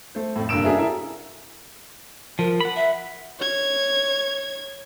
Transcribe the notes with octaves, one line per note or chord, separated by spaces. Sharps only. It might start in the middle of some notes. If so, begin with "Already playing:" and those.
A3 C5
F2 A2
F1 G2 A#3 E6 D7 E7
C#4 D4 F#4 G#4 A#4 E5
E4 A4 A#4 E5
F3 A#4
F#5 B5
E5
C#5 G#6